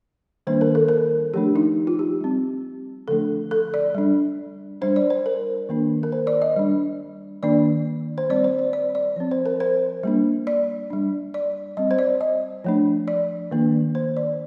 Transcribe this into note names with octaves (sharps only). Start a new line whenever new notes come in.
D#3 G3 A#3 D4 C5
A#4
A4
A#4
F3 A3 D4 G4
D#4
F4
G4
G3 C4
D3 F3 A3 D4 A4
A4
D5
G3 D4
G3 D4 C5
D5
C5
A#4
D#3 A#3 D4
A#4
C5
D5
D#5
G3 D4
D#3 A#3 D4 D5
C5
G3 C4 D5
C5
D5
D5
D5
F3 C4
C5
A#4
C5
G3 A#3 D4
D5
G3 D4
D5
G3 C4 D#5
C5
D5
D#5
F3 A3 D4
D5
D#3 A#3 D4
C5
D5